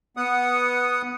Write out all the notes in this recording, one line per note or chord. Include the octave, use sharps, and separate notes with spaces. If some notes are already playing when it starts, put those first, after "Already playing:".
B3 F#5 D#6